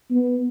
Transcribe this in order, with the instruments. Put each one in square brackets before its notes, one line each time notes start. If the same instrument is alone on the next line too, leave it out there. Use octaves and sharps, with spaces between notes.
[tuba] B3